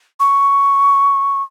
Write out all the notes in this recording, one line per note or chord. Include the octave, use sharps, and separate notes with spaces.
C#6